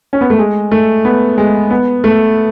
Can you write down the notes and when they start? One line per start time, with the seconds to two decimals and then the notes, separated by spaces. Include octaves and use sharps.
0.13 C#4
0.21 B3
0.30 A3
0.39 G#3
0.71 A3
1.05 B3
1.38 G#3
1.71 B3
2.04 A3